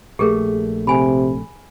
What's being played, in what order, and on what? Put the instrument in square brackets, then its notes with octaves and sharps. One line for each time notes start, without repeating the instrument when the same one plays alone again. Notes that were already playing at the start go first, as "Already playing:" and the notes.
[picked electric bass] A#1 A3 [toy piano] G4 G#4 A#4
[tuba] C3 [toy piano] G#5 B5